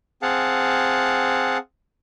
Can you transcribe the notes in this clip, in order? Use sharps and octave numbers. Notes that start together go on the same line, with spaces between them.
C4 G#4 F5 F#5 A5